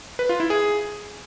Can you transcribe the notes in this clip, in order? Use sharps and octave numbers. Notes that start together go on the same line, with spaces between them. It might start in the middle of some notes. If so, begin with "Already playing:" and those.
B4
F4
E4
G#4